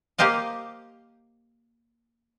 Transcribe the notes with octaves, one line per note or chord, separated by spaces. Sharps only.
A#3 G4 C5 D#5 F5